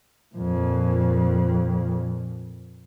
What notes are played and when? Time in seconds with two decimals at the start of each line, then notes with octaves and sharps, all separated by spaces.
0.35 F2 A#2